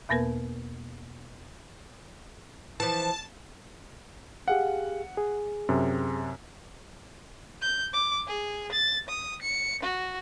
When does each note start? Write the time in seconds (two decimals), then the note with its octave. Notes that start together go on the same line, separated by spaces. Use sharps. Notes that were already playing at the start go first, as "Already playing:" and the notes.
0.09 E2 B2 A#3 B3 A#4 B4
2.80 E3 F3 A5
4.48 G4 G#4 F5 F#5
5.17 G#4
5.69 F#2 C3
7.62 G6
7.93 D6
8.27 G#4
8.72 A6
9.08 D#6
9.42 C#7
9.83 F#4